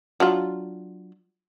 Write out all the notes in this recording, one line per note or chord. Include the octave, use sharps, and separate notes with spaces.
F#3 D4 F4